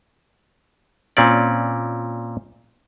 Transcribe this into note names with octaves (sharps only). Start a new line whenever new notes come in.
A#2 C4 C#4 D5